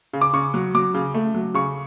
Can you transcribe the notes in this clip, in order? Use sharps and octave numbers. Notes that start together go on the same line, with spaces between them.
C#3
D6
C#3 C#6
F#3
F#3 D6
C#3
A3
F#3
C#3 C#6